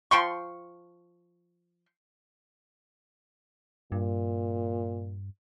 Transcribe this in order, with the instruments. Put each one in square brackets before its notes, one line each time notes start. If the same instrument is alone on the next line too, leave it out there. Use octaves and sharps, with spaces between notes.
[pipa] F3 G5 C6 C#6
[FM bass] G2 [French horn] A#2